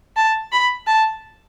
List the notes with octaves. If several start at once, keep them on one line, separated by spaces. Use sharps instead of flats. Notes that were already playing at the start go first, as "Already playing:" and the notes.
A5
B5
A5